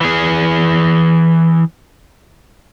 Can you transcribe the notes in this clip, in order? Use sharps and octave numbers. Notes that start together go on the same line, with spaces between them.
E3 G#4